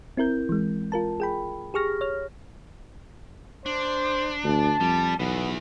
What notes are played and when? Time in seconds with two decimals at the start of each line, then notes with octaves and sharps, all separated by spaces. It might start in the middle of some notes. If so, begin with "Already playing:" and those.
0.17 C4 E4 A#4 G6
0.49 E3 G#3
0.92 F4 A#4 A5
1.20 G#4 G5 B5
1.74 G4 G#4 C#6 F6 A#6
2.01 C#5 F6
3.66 D4 C5
4.44 D2 A5
4.81 F2 G3
5.19 B1 E2 E3 B3